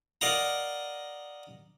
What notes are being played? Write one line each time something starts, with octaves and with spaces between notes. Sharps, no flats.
A#4 D5 D#5 F5 F#5 A#5